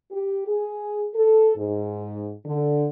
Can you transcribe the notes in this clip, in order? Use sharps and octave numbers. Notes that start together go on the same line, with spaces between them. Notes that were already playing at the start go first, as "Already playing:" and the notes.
G4
G#4
A4
G#2
D3